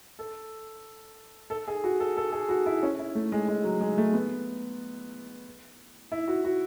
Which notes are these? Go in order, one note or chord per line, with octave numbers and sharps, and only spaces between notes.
A4
A4
G#4
F#4
A4
A4
G#4
F#4
E4
C#4
E4
A3
G#3
G#3
F#3
G#3
A3
B3
E4
F#4
F#4